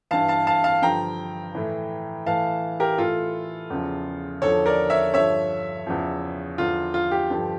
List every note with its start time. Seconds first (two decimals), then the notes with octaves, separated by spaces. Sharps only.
0.11 G2 E3 F5 A5
0.28 F5 A5
0.47 F5 A5
0.64 F5 A5
0.82 G2 D3 F3 G5 A#5
1.55 A2 E3
2.26 A2 E3 F5 A5
2.80 G4 A#4
2.98 A2 E3 F4 A4
3.70 E2 C#3 F3
4.42 E2 D3 F3 A4 C#5
4.66 A#4 D5
4.90 C#5 E5
5.14 G2 D3 F3 C#5 E5
5.87 E2 C#3 F3
6.58 E2 D3 F3 F4
6.94 F4
7.11 G4
7.31 G2 D3 F3